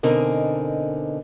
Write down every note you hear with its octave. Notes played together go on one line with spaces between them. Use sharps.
B2 D3 C4 D#4 A#4 G#5